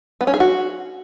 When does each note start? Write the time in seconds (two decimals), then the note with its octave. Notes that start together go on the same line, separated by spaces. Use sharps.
0.21 B3
0.27 C#4
0.34 G#4
0.40 F#4